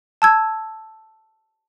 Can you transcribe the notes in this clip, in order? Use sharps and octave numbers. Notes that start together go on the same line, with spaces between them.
A5 E6 G#6